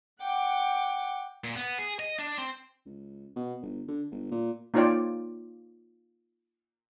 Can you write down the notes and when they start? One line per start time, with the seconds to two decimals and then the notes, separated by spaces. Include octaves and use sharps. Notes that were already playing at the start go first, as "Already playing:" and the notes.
0.20 F#5 G5 D6
1.44 A#2
1.56 B3
1.79 G#4
1.99 D#5
2.19 D4
2.38 C4
2.86 C#2
3.36 B2
3.62 G1
3.88 D3
4.11 G1
4.31 A#2
4.74 A#3 D#4 F4 C#5 D5 G5